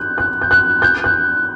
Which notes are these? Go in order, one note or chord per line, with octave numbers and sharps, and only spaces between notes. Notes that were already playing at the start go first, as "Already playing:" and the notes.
Already playing: F#6 G6
F#6
G6
F#6
G6
F#6